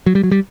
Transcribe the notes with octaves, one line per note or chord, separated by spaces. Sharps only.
F#3
G3
F#3
G3